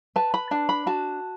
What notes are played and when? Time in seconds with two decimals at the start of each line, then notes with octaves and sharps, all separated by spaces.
0.16 B4 A5
0.34 B5
0.51 D4 A5
0.69 B5
0.86 F#4 A5